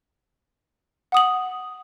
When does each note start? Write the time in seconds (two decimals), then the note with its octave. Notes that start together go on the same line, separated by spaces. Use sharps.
1.12 F#5 D#6 F#7